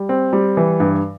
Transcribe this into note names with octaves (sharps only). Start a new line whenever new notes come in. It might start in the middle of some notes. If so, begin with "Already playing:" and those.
Already playing: G3
C4
G3
E3
G2